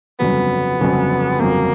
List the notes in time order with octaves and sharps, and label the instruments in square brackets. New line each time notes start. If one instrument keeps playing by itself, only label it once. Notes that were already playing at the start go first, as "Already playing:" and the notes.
[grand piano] G1 F2 C#3 F#3 [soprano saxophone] B3
[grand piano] G1 F2 C#3 F#3
[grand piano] G1 F2 C#3 F#3 [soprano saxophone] A#3